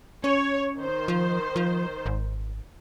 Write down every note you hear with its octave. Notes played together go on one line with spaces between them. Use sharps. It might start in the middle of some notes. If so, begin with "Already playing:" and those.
C#4 C#5
D#3 C5
F3
F3
G#1